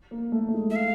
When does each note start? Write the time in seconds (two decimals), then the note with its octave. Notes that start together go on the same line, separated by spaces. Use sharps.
0.11 A#3
0.32 A3
0.48 A3
0.54 G#3
0.70 E5
0.76 F5